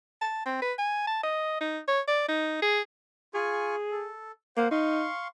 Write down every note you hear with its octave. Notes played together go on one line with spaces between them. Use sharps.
A5
C4
B4
G#5
A5
D#5
D#4
C#5
D5
D#4
G#4
F4 G#4 G#5 C#6
A4
A#3 C5 F5 F#5
D#4 F5 C6 C#6